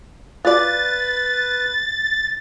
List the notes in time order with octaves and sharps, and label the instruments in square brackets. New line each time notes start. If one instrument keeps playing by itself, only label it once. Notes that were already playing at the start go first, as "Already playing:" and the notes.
[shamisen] F4 D5 [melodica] B4 [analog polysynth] A6